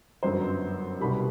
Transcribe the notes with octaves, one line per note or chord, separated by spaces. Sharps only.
G1 F#2 F#3 B3 C5
C2 B2 G3 B5